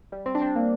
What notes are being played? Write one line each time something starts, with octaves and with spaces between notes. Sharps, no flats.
G3
C4
D4
C4
A#3